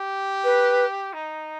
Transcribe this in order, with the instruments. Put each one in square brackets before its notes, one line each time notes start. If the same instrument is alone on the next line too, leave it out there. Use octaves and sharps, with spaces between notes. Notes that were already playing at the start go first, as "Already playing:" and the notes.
Already playing: [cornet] G4
[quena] B4
[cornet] D#4